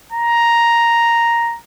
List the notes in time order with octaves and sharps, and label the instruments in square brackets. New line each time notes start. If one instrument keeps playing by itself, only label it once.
[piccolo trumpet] A#5